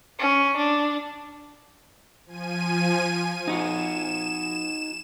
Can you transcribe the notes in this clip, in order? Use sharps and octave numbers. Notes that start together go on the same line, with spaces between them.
C#4
D4
F3 G#5 D#7
D#4 F#4 E7